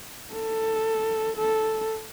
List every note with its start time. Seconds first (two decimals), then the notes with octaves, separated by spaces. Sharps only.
0.33 A4
1.36 A4